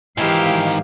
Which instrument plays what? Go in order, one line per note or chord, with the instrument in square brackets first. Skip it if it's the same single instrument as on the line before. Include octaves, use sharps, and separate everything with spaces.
[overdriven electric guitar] G#2 D#3 [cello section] E3 F5 [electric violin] E4 G4